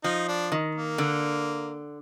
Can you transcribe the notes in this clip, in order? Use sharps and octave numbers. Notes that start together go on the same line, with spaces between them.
F3 D#4
D4
D#3
A#3
D3